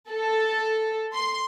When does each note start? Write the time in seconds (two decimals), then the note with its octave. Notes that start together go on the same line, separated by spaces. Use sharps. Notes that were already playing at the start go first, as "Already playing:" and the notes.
0.11 A4
1.14 C6